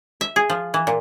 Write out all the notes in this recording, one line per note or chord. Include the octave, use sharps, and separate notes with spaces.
E5
G#4
F3
E3
A#2